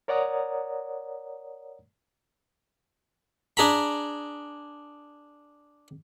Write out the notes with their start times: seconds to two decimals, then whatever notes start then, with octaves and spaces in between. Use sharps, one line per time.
0.08 A#4 C#5 D5 F#5 A#5 D#6
3.57 D4 G#4 A#5 B5